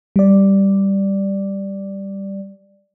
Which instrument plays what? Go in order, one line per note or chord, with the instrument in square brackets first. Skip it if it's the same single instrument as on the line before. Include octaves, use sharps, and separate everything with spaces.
[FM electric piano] G3 D5